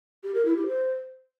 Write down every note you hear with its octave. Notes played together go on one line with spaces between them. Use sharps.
G4
A#4
E4
G4
C5